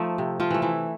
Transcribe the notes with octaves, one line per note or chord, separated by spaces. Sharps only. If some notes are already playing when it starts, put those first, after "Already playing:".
Already playing: F3 A3 D#4
C3
F3 F4
E3 A3
E3 E4